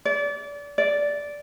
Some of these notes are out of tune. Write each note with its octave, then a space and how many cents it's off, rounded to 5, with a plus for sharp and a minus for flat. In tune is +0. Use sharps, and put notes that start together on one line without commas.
D5 -30
D5 -10